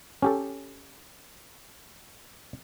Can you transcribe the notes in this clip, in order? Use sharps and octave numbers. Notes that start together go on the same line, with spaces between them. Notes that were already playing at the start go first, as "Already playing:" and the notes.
C#4 G4 A4